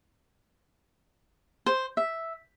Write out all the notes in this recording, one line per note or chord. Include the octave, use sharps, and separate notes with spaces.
C5
E5